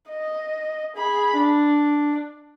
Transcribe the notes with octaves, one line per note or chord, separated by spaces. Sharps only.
D#5
G#4 B5
D4